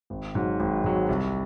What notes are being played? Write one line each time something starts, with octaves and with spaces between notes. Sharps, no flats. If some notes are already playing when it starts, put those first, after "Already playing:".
G#1
G#2 F#3
G#1
G#2 F#3
C2